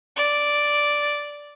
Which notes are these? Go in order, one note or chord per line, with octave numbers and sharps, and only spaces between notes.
D5